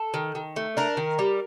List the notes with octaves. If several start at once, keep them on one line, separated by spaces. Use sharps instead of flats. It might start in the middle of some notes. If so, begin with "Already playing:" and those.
Already playing: A4
D#3
D#3
A3
D4 A#4
D#3
G3